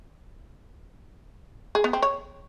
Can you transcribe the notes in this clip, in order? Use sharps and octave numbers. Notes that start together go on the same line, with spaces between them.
G#4
B3
C4
C#5